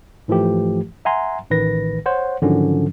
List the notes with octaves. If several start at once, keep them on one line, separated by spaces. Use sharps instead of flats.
G#2 E3 F3 A3 G4
E5 F#5 G#5 A#5 C6
A1 D#3 B4 A#6
C5 C#5 F#5
G#2 D3 D#3 F3 F#3 C#4